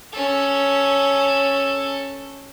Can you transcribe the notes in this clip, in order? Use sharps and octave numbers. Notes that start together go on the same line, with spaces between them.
C#4 A4